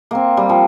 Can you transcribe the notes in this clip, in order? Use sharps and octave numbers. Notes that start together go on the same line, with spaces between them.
A#3 C4
G3
F3